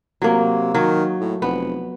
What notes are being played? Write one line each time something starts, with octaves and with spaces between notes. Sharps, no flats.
C3 F#3 A#3
D#3 F#3
A2
F1 B3